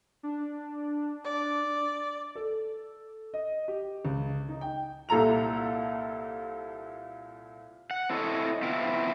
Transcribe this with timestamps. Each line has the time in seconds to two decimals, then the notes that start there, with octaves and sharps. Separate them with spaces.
0.23 D4
1.25 D5
2.35 A4
3.34 D#5
3.68 G4
4.05 C#2
4.49 D#4
4.61 G5
5.09 C2 A#2 A4 A#5 F7
7.91 F#5
8.10 C4 E4 A4 C#5 D#5
8.63 B3 C4 E4 F4